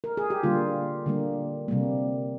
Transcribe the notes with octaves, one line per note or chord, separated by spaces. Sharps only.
A#4
G#4
G4
D3 G3 A#3 F4
D3 G3 A#3
C3 G3 A#3